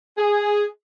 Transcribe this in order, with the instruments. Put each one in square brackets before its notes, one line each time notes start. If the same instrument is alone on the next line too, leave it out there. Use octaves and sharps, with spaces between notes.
[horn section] G#4